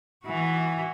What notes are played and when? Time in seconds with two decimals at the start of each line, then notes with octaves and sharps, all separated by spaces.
0.25 E3 F#4